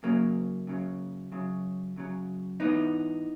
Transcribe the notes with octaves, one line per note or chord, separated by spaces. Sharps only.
F#2 C#3 F#3 A#3
F#2 C#3 F#3
F#2 C#3 F#3
F#2 C#3 F#3
G#2 E3 B3 D#4